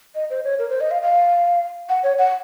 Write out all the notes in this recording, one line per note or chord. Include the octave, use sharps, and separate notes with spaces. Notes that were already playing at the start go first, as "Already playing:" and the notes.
D#5
C5
C#5
A#4
C5
D#5
F5
F5
F#5
C#5
F#5